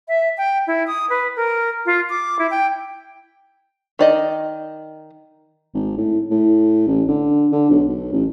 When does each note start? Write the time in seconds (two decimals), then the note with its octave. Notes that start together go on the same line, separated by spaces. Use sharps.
0.08 E5
0.38 G5
0.67 E4
0.87 D#6
1.10 B4
1.36 A#4
1.86 F4
2.10 D6
2.39 E4
2.51 G5
3.99 D#3 D5 D#5
5.73 G#1
5.97 A2
6.31 A2
6.87 A1
7.08 D3
7.51 D3
7.70 B1
7.88 B1
8.12 A1